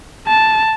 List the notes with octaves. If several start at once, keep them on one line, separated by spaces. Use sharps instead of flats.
A5